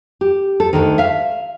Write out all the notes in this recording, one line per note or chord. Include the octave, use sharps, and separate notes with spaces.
G4
A4
D2 B2 D3 D#3
E5 F5